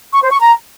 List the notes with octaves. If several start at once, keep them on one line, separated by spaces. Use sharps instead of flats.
C#6
C5
C#6
A#5